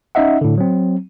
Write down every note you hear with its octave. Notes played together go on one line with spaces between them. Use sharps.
C#4 D#4 D#5 E5 F#5
A2 D3
F#3 C4